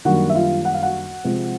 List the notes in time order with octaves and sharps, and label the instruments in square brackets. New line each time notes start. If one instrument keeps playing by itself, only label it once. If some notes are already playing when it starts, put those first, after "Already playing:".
[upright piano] F#2 D#3 G3 A#3 D4 F#4 F#5
E5
F4 F5
F#5
F5
F#4 F#5
C3 F3 G#3 C4